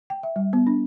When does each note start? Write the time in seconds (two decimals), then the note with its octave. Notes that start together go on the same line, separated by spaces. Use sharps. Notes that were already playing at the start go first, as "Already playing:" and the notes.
0.10 G5
0.23 E5
0.36 G3
0.53 B3
0.67 D4